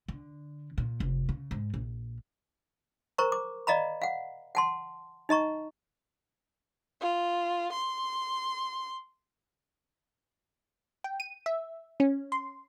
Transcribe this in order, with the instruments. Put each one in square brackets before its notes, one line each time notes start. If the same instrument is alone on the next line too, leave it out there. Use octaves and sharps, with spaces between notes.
[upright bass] D3
A#2
F1
C#3
G#2
A#1
[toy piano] A#4 C5 A#5 C#6
D6
D5 D#5 F5 A#5 B5
F5 F#5
F#5 A5 C6
D#4 D#5 A#5 C#6
[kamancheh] F4
C6
[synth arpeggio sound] G5
D#7
E5
C#4
C6